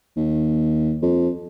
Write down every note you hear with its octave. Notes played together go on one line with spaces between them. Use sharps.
D#2
F2